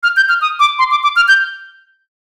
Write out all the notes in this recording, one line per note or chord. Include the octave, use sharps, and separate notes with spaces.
F6
G6
F6
D#6
D6
C6
D6
D6
F6
G6